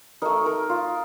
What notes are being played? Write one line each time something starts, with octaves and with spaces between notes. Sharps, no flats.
A3 D#4 A#4
A#4
F4